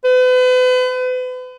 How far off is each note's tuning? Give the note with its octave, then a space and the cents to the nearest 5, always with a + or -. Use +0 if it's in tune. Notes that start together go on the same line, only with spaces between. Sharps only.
B4 +40